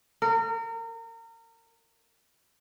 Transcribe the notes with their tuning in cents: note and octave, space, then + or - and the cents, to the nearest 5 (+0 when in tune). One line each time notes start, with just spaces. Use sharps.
A#4 -30